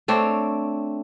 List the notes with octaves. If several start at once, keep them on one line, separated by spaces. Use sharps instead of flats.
A3 C4 D4 C#5